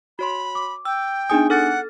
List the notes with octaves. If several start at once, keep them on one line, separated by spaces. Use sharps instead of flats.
F#4 C#5 B5 C6
D6
G5 E6
B3 D4 D#4 G#4 G#5 D#6
A4 F#5 F6 A6